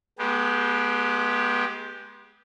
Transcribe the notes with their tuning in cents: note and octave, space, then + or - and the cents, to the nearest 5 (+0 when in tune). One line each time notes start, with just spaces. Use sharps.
G#3 +25 B3 -25 G4 +0